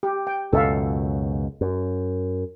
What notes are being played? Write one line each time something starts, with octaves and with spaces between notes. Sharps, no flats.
G4
G5
C#2 F#2 B2 A4 E5 F5
F#2